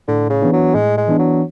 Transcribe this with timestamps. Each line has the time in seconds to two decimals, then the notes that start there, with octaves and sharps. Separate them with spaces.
0.08 A2 D3
0.30 C#3
0.42 E3 B3 D4
0.53 F#3
0.75 A2 G#3
0.97 G#3
1.08 E3 B3 D4
1.19 F#3